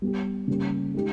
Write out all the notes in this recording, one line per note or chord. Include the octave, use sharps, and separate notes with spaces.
G3 B3 G4
C#3 G3 A#3 C#4 G4
G#3 D#4 G4